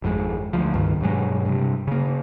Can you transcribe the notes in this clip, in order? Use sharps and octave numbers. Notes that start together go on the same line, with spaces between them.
G#1 F2 C#3 G#3
D2 F3
C#2 G2 D#3
G2 B2 F#3 G#3
G2 C3
C#3 A#3